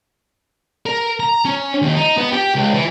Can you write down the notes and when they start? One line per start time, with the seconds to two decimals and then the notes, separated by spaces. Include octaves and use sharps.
0.86 A#4
1.20 A#5
1.45 C#4
1.82 D#2
1.96 D#4
2.18 B3
2.32 G4
2.55 C#2
2.74 E3